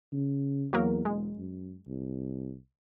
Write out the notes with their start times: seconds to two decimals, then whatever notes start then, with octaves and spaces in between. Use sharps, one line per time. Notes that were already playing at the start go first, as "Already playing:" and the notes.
0.12 C#3
0.73 E2 F#3 A#3 A#4
1.05 E1 G#3
1.37 F#2
1.87 C2